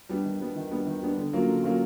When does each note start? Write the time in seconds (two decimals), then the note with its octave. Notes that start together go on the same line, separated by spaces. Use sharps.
0.09 G3 B3 D4
0.25 D#3
0.40 G3 B3 D4
0.56 D#3
0.71 G3 B3 D4
0.87 D#3
1.02 G3 B3 D4
1.17 D3
1.33 F#3 A#3 C#4 F4
1.49 D3
1.64 F#3 A#3 C#4 F4